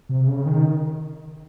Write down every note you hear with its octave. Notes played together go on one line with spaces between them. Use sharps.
C3
C#3
D#3